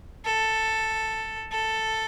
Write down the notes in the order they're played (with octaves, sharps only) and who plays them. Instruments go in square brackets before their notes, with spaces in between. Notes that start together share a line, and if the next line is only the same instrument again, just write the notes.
[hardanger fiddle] A4
A4